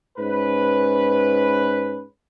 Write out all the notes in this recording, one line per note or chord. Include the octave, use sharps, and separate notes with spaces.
G#2 C#4 B4